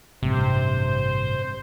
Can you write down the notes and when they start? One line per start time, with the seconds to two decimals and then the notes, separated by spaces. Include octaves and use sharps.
0.23 A1 G2 C3 C5